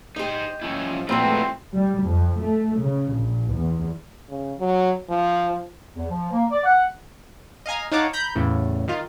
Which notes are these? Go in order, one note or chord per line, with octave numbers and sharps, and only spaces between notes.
D#4 G4 C5 D#5
F3 G3 C#4 E4
G2 A#2 G#3 A3 C4 E4 F#4 B4
G3
F2
A3
C#3
A#1
E2
C#3
F#3
F3
E2
F3
A#3
D5
F#5
D#5 F5 G#5 A#5
D#4 C#5 F5 F#5 A5 D6
A#5 B5 G6
E2 A2 C#3
D#3 F4